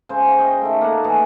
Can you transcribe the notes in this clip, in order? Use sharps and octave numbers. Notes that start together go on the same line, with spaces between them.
C#3 G#3 C5
F#4
D#5 F5 G5
D#3 A3
A#3 A4 F#5
E3 A3 F#4 G#4